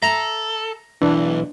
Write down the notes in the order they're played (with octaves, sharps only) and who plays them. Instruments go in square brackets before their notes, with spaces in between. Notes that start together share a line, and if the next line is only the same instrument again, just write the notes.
[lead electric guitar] A4 [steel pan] E5 [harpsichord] A#5
[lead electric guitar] B1 [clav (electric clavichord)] E3 [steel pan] D4